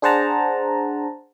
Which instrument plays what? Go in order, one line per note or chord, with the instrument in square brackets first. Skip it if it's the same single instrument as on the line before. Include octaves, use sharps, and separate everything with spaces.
[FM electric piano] D4 G#4 C5 F#5 A5 A#5